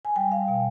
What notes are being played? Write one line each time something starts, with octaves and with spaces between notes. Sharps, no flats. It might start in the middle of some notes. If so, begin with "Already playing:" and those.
G#5
G3 G5
F5
B2